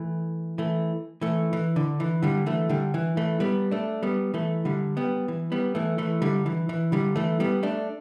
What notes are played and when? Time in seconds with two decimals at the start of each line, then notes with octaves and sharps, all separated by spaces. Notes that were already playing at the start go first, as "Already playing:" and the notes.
Already playing: E3 A3
0.58 E3 A3
1.21 E3 A3
1.53 E3
1.76 D3
2.00 E3
2.23 D3 G3
2.46 E3 A3
2.69 D3 G3
2.94 E3
3.17 E3 A3
3.40 G3 B3
3.71 A3 D4
4.03 G3 B3
4.34 E3 A3
4.65 D3 G3
4.97 G3 B3
5.28 E3
5.52 G3 B3
5.75 E3 A3
5.98 E3 A3
6.22 D3 G3
6.46 E3
6.69 E3
6.92 D3 G3
7.16 E3 A3
7.40 G3 B3
7.63 A3 D4